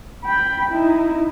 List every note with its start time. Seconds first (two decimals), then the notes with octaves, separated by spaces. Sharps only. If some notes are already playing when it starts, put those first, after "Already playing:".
0.24 G5 B5
0.72 D#4 E4